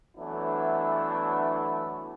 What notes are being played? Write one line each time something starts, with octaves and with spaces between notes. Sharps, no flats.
E3 F#3 A3 B3 D4 E4